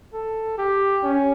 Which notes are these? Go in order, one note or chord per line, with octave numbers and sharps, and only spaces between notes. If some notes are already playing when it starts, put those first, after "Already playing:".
A4
G4
C#4